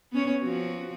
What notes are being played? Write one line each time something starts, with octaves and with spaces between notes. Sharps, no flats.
B3 C#4 C#5
F3 C4 F#4